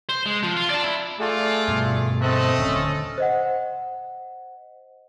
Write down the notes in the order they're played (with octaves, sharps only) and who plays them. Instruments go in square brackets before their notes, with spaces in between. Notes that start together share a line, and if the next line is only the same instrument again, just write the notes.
[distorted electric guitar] C5
G#3
F3
F4
D5 A5
E4
[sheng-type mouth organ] A3 G#4 [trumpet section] F4 A4 D5
[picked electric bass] G2 B2
[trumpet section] A3 A4 D#5 [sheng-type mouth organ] C4 F#6
[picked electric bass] D#1 D3 [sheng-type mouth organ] C#4
[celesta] C5 D#5 F#5